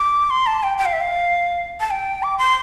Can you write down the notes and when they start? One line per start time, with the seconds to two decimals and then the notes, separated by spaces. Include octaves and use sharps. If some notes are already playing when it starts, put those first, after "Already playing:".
Already playing: D6
0.30 C6
0.46 A5
0.63 G5
0.78 G5
0.86 F5
0.93 E5
1.00 F5
1.80 A5
1.91 G5
2.23 D6
2.38 C6